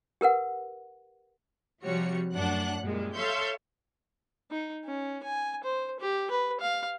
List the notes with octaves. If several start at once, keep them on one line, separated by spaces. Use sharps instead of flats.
G4 A#4 B4 F#5
C3 F3 G3 F#4 C#5 C#7
F#2 A2 D4 F#5 F#6
F#2 A#2 G3 G#3
A4 C#5 E5 F5 C6 G6
D#4
C#4
G#5
C5
G4
B4
F5